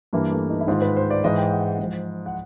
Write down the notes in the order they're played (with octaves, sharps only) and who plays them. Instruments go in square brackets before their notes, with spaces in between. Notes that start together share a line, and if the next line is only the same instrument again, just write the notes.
[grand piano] G2 E3 A#3
A3
D#4
E4
G#2 D#3 F4
B4
C5
D5
G#2 E3 D#5
G5
F#5
G#2 F3
F#5